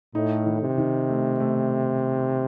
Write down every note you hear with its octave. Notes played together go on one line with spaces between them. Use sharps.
A2 D#4
D#3
C3
D#3
A3
A3